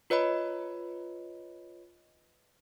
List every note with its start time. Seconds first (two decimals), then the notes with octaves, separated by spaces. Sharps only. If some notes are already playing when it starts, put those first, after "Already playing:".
0.10 F4 B4 C#5 D#5 B5